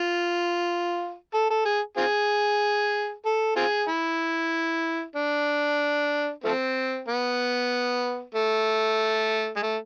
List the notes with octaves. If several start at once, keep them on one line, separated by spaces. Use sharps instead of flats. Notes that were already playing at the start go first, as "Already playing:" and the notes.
Already playing: F4
A4
A4
G#4
C4 F4 G#4
A4
C4 F4 G#4
E4
D4
F3 A3 C4
B3
A3
G#3
A3